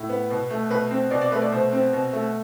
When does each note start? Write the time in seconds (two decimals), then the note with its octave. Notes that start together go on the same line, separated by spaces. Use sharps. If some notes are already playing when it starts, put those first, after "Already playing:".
Already playing: A2
0.09 B3
0.30 B2
0.50 A3
0.70 B2 B4
0.91 C4
1.11 B2 D5
1.22 D5
1.32 A3 B4
1.42 D5
1.52 B2 C5
1.72 C4
1.93 B2
2.13 A3